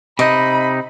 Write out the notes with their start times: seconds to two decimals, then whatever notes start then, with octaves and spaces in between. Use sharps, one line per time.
0.19 C3 D#4 D#5 B5